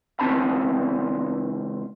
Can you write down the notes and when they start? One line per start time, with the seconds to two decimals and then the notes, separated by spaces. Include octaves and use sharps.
0.20 C#2 E3 C4 C#4 A5 B5